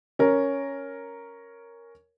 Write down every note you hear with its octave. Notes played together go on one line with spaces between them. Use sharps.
C#4 A#4